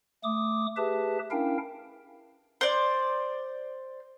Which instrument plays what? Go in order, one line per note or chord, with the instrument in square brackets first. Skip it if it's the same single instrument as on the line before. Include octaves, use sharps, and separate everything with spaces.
[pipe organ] A3 D6 D#6
G4 G#4 B4 E5 A5
C#4 D4 E4 A#4 F5 G5
[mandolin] C5 D5